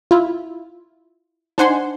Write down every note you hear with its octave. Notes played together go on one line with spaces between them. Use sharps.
E4 F4
D4 D#4 C5 F#5 G#5 C6